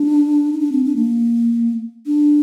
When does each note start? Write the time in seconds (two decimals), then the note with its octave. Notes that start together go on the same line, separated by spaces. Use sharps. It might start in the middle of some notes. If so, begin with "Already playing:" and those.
Already playing: D4
0.53 D#4
0.60 D4
0.72 C4
0.85 D4
0.96 A#3
2.06 D4